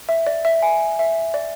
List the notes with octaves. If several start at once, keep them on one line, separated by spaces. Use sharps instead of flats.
E5
D5
E5
G#5
E5
D5